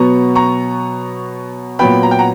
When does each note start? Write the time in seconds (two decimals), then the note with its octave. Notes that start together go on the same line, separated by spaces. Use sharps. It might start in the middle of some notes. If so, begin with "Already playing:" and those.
Already playing: B2 F#3 B3 A#5 C#6
0.36 A#5 C#6
1.79 A#2 F#3 B3 G5 B5
2.03 A#5
2.11 G5
2.19 F#5 A#5